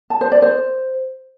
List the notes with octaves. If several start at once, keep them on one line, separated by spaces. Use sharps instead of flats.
A5
C5
D5
C5